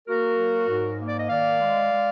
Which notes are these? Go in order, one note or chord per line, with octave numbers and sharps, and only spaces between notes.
A#3 F#4 A#4
F#3
G#2
A#3
D5
D#5
D#3 D5 F5
G#3
G#3